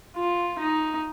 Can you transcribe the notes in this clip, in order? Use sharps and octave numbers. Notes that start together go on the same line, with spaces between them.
F4
D#4